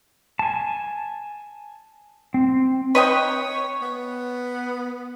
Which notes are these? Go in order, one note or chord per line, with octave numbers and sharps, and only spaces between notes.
G#5 A5
C4
B4 C#5 D#5 G5
B3